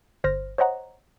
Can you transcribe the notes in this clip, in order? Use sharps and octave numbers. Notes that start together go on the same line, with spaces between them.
G1 C5 F6 A#6
C5 C#5 D#5 F#5 A#5